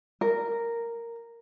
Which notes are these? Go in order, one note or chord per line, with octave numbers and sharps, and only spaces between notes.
A#4